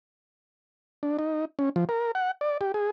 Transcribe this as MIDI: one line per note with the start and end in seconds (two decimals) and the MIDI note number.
1.03 1.17 62
1.19 1.45 63
1.59 1.69 61
1.76 1.85 53
1.89 2.11 70
2.15 2.31 78
2.41 2.58 74
2.61 2.72 67
2.74 2.90 68